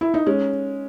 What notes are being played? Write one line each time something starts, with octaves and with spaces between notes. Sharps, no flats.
E4
D#4
G#3 C#4